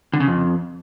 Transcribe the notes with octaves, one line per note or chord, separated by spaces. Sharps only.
D3
C#3
F2